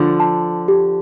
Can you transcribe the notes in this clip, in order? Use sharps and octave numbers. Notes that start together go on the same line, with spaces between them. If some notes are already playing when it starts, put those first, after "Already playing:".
Already playing: D3 F3 F4
A5
G4